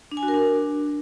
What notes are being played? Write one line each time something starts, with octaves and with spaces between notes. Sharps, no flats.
D4
G#5
F#4
A#4
D4